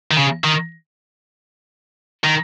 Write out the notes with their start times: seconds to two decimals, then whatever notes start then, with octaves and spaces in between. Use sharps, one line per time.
0.11 D#3
0.17 C#3
0.44 D#3
2.24 D#3